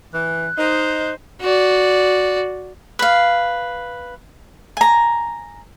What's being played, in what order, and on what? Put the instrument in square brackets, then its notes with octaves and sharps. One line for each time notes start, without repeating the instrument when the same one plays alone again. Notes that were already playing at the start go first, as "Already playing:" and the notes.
[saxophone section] E3 [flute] F#6
[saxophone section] D#4 [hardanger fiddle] C5
[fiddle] F#4 D5
[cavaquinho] B4 F5
G#5 A#5